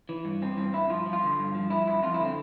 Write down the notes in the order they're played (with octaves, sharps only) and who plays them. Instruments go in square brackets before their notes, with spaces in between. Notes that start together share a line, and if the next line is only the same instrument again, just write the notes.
[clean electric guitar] E3
G2
E3 C4
G2 C4
G2 E4
F3 F4
F3
F4
D3
G2
F3
F3 E4
G2 E4
F2 F4
E4
D3 C4